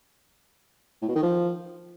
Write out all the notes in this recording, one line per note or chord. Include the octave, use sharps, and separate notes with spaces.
A2
B2
D#3
F3